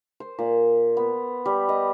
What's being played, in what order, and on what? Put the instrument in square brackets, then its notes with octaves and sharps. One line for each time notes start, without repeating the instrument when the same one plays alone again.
[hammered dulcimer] C5
A#2
B3
G3
D#5